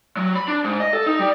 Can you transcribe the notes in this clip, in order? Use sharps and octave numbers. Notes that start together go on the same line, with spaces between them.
F#3
B5
D4
G#2
D#5
A4
D#4
G3